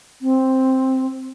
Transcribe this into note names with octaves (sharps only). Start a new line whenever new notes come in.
C4